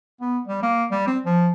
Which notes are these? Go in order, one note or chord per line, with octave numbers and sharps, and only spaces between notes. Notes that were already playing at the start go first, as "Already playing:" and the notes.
B3
G3
A#3
G3
C4
F3